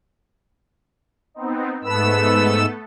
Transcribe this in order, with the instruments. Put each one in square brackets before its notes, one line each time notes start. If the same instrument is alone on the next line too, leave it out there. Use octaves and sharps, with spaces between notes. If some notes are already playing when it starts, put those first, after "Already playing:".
[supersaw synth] B3 C4 D#4
[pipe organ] G#2 E6 [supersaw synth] A3 B3 A4 [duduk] B4